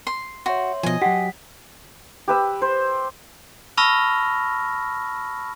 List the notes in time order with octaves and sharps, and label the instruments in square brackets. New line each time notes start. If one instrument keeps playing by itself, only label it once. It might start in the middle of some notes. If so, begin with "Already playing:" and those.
[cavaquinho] C6
[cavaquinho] F#4 [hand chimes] C#5 E5 C6
[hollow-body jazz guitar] B2 F3 [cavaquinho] D#5 G#5
[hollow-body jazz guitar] F#3 G4 [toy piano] F#4 F#5 [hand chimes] B6
[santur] G4 B4 E6
C5
[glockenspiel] A5 B5 C#6 E6 F6 A#6